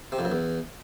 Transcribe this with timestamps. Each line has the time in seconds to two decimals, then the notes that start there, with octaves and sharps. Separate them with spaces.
0.12 C3
0.19 F2
0.25 F#2
0.32 E2